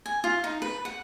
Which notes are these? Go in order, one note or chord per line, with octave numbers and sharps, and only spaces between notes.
G#5
F4
D#4
B4
F#5